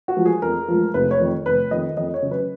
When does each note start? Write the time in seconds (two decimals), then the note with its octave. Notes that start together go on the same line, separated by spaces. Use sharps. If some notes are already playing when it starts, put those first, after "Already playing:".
0.08 F#4
0.16 F3 G#3
0.26 G#4
0.42 F2 A#4
0.68 F3 G#3
0.94 F1 B4
1.11 C#5
1.20 F2 D#3
1.46 F1 B4
1.71 F2 D#3 D#5
1.97 F2 D#5
2.14 C#5
2.22 C#3 F#3
2.31 B4